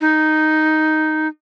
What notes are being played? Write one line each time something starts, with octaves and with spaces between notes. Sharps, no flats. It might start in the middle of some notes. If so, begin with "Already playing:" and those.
D#4